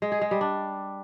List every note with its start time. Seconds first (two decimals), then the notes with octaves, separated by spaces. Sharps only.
0.02 G#3
0.12 G#4
0.21 G#3
0.31 G3
0.41 D4